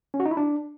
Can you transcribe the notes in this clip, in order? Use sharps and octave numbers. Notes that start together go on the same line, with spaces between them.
C#4
F#4
D#4
E4
D4